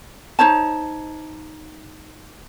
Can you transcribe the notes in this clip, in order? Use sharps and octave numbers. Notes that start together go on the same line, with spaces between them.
D#4 C5 C#5 A5